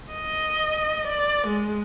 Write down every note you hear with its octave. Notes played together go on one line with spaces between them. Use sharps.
D#5
D5
G#3